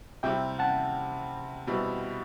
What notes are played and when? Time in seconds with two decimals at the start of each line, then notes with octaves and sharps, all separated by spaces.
0.23 C3 G3 C4 E4 E5 G5
0.59 F#5 A5
1.67 B2 G3 C4 E4